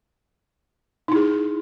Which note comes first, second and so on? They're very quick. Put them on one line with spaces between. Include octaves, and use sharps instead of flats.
D#4 E4 G#4